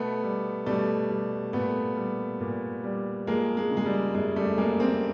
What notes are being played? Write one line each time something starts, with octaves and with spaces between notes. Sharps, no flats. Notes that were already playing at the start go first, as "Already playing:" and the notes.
Already playing: B2 A3 B3
G3
B2 G3 A3
G3
A#2 A3 B3
G3
A#2
G3
F3 G#3 A#3
G#3
C#3
G#3
G3
F#2 G#3
G3 A3
F#2 G#3 A#3
A#3 C4